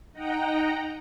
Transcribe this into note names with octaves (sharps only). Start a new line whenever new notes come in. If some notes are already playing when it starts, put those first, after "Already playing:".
D#4 D#5 F#5 G5 A#5